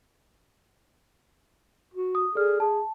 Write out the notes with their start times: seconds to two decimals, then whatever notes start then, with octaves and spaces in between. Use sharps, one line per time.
1.94 F#4
2.15 D#6
2.35 G#4 A4 D5 F6
2.60 G#4 A5